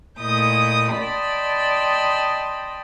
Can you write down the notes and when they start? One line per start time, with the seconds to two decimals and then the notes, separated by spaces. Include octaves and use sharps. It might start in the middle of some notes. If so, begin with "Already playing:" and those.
0.20 A#2 A3 E4 D#5 D#6 G6
0.94 D5 D#5 G5 A5 B5 C6